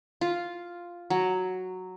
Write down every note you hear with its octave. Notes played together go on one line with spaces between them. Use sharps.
F4
F#3